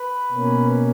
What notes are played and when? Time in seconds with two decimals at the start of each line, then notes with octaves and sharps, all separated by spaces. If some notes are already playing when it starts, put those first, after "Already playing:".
Already playing: B4
0.32 B2 A#3 C#4